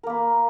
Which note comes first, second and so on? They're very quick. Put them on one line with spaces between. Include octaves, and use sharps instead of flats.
A#4 A#3 B4